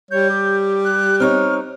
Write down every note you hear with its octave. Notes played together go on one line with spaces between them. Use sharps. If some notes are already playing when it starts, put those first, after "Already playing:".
G3 C#5 G6
G4
F#6
C4 D#4 C#5 F6